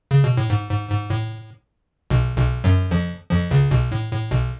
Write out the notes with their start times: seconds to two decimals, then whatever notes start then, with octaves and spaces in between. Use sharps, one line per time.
0.11 C#3
0.24 B2
0.37 A2
0.50 G#2
0.70 G#2
0.90 G#2
1.10 A2
2.10 B1 B2
2.37 B1 B2
2.64 F#2 F#3
2.91 F2 F3
3.31 F2 F3
3.51 C#2 C#3
3.71 B1 B2
3.92 A2
4.12 A2
4.31 B1 B2